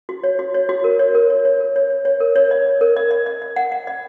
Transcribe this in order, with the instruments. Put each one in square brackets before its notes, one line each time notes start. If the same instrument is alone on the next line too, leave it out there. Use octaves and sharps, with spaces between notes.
[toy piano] F#4
C#5
F#4
C#5
F#4
A#4
C#5
A#4
C#5
C#5
A#4
C#5
C#5
C#5
A#4
C#5
D#5
D#5
A#4
D#5
D#5
D#5
D#5
F#5
F#5
D#5